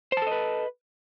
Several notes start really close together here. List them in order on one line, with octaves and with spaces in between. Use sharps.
C5 A5 A4 D#5 B4